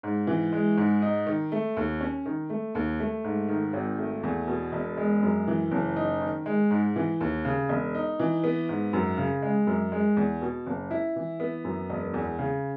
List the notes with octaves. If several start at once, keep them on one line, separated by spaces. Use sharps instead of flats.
G#2
E3
G#3
G#2
D#4
D#3
A3
D#2
C#4
D#3
A3
D#2
A3
G#2
D#3
G#1
A3
E2
B2
E1
G#3
F#2
E3
F#1
D#4
D#3
G#3
G#2
E3
D#2
C#3
E1
D#4
E3
B3
G#2
F#2
C#3
G#3
F#2
G#3
E2
B2
F#1
E4
E3
B3
F#2
E1
E2
C#3